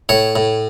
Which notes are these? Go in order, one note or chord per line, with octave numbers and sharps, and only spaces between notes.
A2 C#5
A2